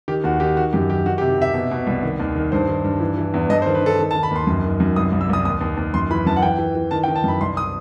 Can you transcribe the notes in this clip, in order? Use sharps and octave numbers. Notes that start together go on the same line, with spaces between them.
D#3 G4
D#2 F#4
D#3 G4
D#3 F#4
F#2 G4
D#3 G4
D#3 F#4
G4
C3
C3 E5
B2
B2
C2
D#3
D#2
D#3
G2 C5
D#3
G2
E3
E3
E2
G2 D#5
C5
D#3
B4
D#3 A4
D#3
A5
D#3
B5
D#2 C6
F#2
D#3
F#2
C2 D#6
C2
E6
C2 D#6
D#2 D#6
D#2
D#2
F#2 C6
E3 B5
F#2 A5
F#5
E3 G5
E3
E3
D#3 A5
G5
D#3
A5
F#2 B5
C2 C6
D#6